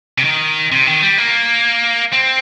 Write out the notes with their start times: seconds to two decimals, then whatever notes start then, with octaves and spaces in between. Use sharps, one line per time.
0.18 C3
0.24 D#3
0.72 C3
0.87 D#3
1.03 G3
1.18 A#3
2.13 C4